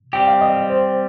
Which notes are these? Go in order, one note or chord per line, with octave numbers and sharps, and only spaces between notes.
G3 C4 G4 G5
F5
D#5
C5